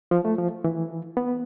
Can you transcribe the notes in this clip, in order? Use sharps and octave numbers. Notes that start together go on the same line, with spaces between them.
F3
A3
F3
E3
B3